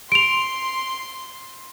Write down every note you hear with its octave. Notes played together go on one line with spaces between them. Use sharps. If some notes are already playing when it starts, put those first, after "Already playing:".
C6 D7 F7